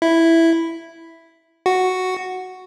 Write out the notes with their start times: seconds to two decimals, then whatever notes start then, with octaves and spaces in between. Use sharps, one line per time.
0.02 E4
1.66 F#4